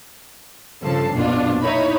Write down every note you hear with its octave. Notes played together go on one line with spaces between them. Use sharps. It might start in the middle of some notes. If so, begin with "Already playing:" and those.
G2 C#3 F3 A4 A5 C7
A#1 F#2 B2 D4 F4
D#4 E4 C#5 B5